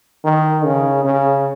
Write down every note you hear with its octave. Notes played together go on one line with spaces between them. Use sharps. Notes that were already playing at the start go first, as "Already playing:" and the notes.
D#3
C#3
C#3